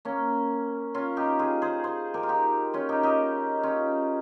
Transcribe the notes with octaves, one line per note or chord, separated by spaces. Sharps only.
A#3 C#4
C#4 F4
D#4 G4
F4 G#4
G#4 C5
G#4 C5
G4 A#4
F4
D#4 G4
C#4 F4
D#4 G4
D#4 G4
C#4 F4